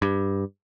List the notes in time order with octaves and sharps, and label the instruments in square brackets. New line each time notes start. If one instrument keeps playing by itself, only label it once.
[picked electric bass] G2